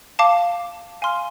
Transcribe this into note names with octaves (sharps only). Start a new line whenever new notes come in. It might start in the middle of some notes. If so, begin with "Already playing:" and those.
F5 A5 D6
F5 G#5 C6 F6